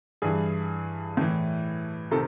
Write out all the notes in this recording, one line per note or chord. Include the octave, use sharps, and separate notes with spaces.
G2 E3 G#4
A2 E3
C3 D#3 A4